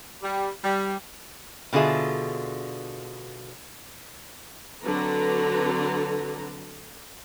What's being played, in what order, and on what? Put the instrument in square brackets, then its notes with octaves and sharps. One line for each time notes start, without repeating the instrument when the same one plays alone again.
[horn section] G3
G3
[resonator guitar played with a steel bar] B2 D3 F4 G#4 E5
[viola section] D3 F#3 C4 A4 B4 A#5